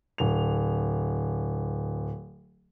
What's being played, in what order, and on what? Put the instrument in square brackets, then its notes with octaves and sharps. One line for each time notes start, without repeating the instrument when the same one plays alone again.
[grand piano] D1 F7